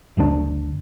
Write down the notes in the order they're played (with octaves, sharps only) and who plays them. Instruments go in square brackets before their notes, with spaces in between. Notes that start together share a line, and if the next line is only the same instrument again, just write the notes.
[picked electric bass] F#1 D2 C#3 D4